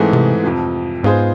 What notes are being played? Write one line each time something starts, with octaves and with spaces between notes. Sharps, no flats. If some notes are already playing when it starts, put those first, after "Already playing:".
Already playing: G#2 E3 A3 C4 G#4
C3
F2 C3 F3
G#2 G#3 B3 F4 G#4 C5